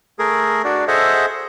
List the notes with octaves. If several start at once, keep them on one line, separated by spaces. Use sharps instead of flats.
A3 G#4 A#4
D4 F#4 D5
G#4 A4 C5 D#5 E5 F#5